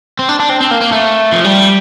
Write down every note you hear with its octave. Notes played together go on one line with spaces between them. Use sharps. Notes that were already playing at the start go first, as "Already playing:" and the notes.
C4
D4
D4
C4
C4
A#3
A#3
A3
F3
G3